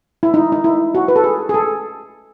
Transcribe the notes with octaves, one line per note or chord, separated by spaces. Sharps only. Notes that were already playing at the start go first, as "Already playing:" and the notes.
E4
D#4
D#4
E4
F#4
B4
A4
G#4
G#4
A4